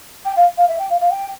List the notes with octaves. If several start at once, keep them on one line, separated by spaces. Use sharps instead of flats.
G5
F5
F5
E5
G5
F5
F5
G5